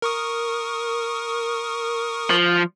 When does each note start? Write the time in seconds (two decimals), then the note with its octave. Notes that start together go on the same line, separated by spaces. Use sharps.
0.02 A#4 C#6 D#6
2.30 F3